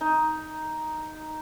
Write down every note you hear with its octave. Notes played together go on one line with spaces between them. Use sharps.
D#4